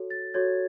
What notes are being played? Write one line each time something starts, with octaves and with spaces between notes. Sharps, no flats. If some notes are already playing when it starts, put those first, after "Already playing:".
Already playing: F#4 A4 C#5
A6
F#4 A4 C#5 G#6